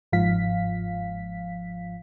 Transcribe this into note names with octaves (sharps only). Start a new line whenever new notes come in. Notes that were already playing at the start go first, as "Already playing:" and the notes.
G1 G#2 F3 F5 B6